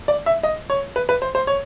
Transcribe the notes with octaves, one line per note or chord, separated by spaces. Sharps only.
D5
E5
D#5
C#5
B4
B4
C5
C5
C#5